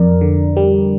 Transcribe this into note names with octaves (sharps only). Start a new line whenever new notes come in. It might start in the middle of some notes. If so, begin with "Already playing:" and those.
Already playing: F2 A#4 D5
D3
G3